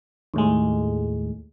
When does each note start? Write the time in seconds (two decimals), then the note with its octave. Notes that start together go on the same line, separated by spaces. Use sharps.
0.34 D#2 A2 G#3